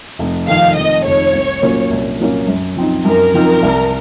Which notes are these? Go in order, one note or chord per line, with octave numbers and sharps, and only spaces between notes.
F1
F2 D#3 F5
F1 D#5
F2 D#3 C#5
C2
A#2 F#3 A#3 C#4
C2
A#2 F#3 A#3 C#4
F#2
F3 C4 D#4
F#2 A#4
F3 C4 D#4
C2